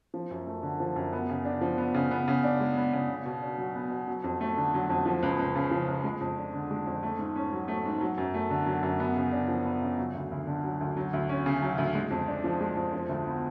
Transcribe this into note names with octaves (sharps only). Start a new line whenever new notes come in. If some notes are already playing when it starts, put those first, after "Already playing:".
F3
F#2
A3
D3
F3
F#2
B3
C#3
D4
F3
B3
C#3
B3
C#3
D4
G#3
B3
C#3
B3
B2
D4
F#3
B3
B2
F#3
F2
A3
D3
F#3
F2
F3
C#2
C#2
C#3
F3
C#2
G#3
F2
D4
D3
G#3
F2
A3
G#2
C#4
F#3
A3
G#2
F#3
F#2
A3
D3
F#3
F#2
B3
C#3
D4
F3
B3
C#3
F#3
D2
D2
D3
F#3
D2
F#3
D2
C#4
C#3
F#3
D2
G#3
F2
D4
F3
G#3
F2
F3
D2
B3